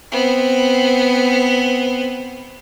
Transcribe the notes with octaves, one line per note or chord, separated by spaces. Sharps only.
B3 C4